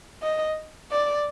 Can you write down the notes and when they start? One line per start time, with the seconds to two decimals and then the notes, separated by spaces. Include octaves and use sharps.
0.22 D#5
0.91 D5